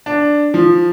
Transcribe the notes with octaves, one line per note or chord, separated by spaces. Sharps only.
D4
F3